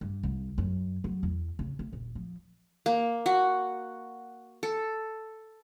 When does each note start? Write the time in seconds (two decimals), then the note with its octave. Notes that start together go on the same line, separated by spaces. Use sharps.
0.01 G2
0.23 C2
0.58 F#2
1.04 F#3
1.23 E2
1.59 C#3
1.79 D2
1.93 D#1
2.15 F3
2.86 A#3
3.26 F#4
4.63 A4